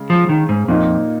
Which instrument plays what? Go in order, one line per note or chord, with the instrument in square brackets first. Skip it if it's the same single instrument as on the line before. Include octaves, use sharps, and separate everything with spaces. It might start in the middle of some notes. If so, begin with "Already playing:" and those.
Already playing: [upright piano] C#3 G#3
[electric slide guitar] F3
D#3
G#2
[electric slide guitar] F2 [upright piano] A#2 A#3 D#4